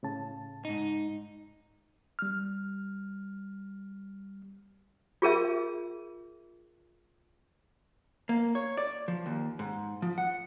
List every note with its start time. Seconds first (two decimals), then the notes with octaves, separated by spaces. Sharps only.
0.03 A2 C#3 A5
0.65 G#2 D#4
2.19 G3 F6
5.22 F4 G#4 A#4 E5
8.29 A#3
8.55 C#5
8.77 D5
9.08 F3
9.26 D#2
9.59 G#2
10.02 F3
10.18 F#5